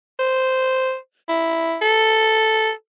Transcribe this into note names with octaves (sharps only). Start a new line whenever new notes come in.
C5
E4
A4